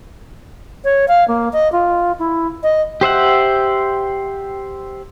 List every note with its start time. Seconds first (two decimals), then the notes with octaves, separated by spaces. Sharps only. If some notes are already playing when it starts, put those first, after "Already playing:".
0.84 C#5
1.08 F5
1.28 A#3
1.53 D#5
1.72 F4
2.19 E4
2.63 D#5
3.01 G4 C5 E5 F#5